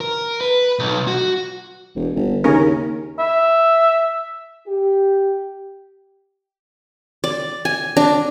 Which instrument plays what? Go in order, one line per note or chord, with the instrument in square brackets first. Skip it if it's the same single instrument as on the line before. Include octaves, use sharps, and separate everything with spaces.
[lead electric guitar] A#4
B4
B1
F#4
[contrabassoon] E1
G1
[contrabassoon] D#2 [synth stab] C#3 C#4 A#4
[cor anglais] E5
[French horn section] G4
[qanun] D5
G#5
D4